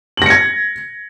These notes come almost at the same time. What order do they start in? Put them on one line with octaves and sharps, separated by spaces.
F#7 A#6 C#7 G#6